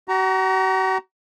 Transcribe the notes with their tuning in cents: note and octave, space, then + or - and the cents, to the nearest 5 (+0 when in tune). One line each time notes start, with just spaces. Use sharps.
F#4 +40 A#5 +0